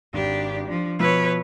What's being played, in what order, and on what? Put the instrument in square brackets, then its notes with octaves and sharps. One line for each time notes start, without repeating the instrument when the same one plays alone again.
[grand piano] G#1 [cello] D4 G4
[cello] F3 [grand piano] D4
[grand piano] B2 F3 E6 [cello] B4 C#5